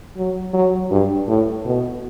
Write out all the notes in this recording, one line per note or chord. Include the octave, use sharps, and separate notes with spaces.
F#3
F#3
G2
A2
B2